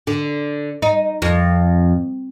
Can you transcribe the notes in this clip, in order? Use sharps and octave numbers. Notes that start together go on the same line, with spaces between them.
D3
D#4
F2